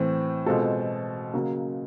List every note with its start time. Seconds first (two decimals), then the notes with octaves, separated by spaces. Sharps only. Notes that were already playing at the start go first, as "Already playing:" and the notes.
Already playing: A2 E3 C4
0.46 B2 G#3 C4 F4 A4
1.33 C#3 F#3 A#3